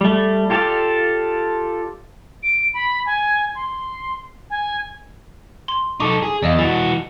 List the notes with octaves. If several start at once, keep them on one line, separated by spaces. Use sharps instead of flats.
G3 A3
F4 G4 A4 D5 F5
D7
B5
G#5
C6
G#5
C6
D#4 A4 C#6 D6
G#4
E2 D5 D#5 F5
E3 F#4 A6